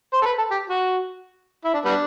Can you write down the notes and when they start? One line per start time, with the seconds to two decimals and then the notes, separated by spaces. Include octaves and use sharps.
0.13 C5
0.22 A4
0.26 B4
0.38 A4
0.51 G4
0.70 F#4
1.65 E4
1.73 D4
1.85 G3 B3 D4